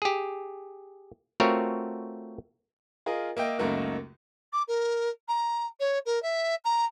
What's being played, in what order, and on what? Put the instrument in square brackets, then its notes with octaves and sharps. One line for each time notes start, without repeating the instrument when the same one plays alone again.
[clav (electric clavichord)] G4 G#4
A3 C4 F4 F#4 A#4 C#5
[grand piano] F4 G#4 A#4 D#5
A#3 D#5 E5 G5
C#2 F#2 A3 A#3 D#4 F#4
[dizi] D6
A#4
A#5
C#5
A#4
E5
A#5